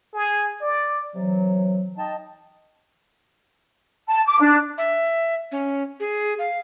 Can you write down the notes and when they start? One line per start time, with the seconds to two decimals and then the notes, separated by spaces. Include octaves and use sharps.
0.14 G#4
0.62 D5
1.16 C3 E3 F#3
1.98 D#4 D#5 G5 A5
4.08 A5
4.26 D6
4.40 D4
4.78 E5
5.52 C#4
6.00 G#4
6.39 F5